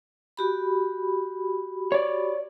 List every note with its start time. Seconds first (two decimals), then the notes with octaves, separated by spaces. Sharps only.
0.37 F#4 G4 B5
1.92 C#5 D5